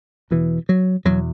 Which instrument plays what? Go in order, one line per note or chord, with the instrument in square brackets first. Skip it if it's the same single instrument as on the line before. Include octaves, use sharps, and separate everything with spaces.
[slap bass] E2 B2 E3
F#3
E2 B2 F#3